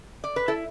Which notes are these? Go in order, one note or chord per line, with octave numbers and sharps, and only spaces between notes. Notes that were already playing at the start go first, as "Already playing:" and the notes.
D5
B4
E4 A4